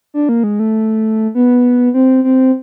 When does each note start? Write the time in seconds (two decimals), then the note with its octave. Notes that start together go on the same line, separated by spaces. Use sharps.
0.14 D4
0.29 A#3
0.44 G#3
0.60 A3
1.35 B3
1.94 C4
2.24 C4